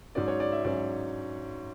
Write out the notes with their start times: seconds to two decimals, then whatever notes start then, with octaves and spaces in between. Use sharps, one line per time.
0.15 G#2 F#3 C#4 D5
0.28 C#5
0.40 D5
0.52 E5
0.64 G#2 F#3 C#4 D5